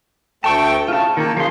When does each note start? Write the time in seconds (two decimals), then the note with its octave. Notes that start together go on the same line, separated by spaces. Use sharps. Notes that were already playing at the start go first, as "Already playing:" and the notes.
0.44 D2 A3 G5 A5 C#6
0.88 C#3 F4 A5
1.17 D#3 A#3
1.37 C#3 F3 C6